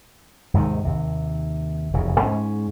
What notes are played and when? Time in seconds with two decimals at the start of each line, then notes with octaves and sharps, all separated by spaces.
0.54 D#2 G#2 C3 D#3
0.85 D#2 C3
1.94 F1 E2 C#3
2.21 G#2 C#4